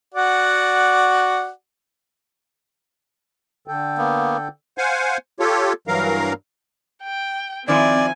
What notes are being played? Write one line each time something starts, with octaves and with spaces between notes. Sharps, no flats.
F#4 D5 F#5
D3 A4 G5
A#3 B3
C5 F5 F#5 G#5
F4 G4 A4 C#5
G2 E3 F#3 A#4 F5 A#5
G5
D#3 F3 C4 E4 D5 G#5